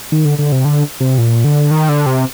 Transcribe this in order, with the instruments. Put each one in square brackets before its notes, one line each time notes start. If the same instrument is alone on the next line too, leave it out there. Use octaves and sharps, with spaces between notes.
[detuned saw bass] D#3
D3
D3
C3
D3
C3
A#2
D3
D#3
D3
C3